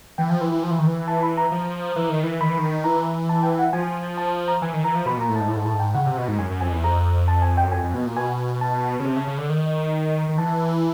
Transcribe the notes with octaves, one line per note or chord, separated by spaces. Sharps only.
E3 G5
F3
E3
E3
F3
E3
D#3
E3
A5
B5
A#5
F3
E3
D#3
E3
D#3 B5
E3
D#3
E3 A#5
A5
G5
F#5
F3 G#5
A5
A#5
E3 G#5
D#3
E3 A#5
F3
B2 B5
A#2 A#5
A2
G#2 A5
A2 A5
G#2
A2 A5
G#2
G5
C#3 F#5
C3
B2
G#2
F#2 G#5
F#2
F2 G#5
E2
F2 A#5
A5
G#5
G5
F#2
F2 G#5
F2
B2
A#2
B2 G#5
A5
C#3
C3
C#3
C#3
D3
D#3
D#3
E3 A5